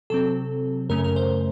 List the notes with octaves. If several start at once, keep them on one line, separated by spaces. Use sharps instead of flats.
C3 F#3 C4 A4
F#2 C#3 A3 C#4 A#4
A#4
C5